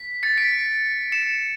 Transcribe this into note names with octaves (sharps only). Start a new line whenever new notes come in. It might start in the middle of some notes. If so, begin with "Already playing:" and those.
Already playing: B6
A6 C#7
B6 D7
C#7 E7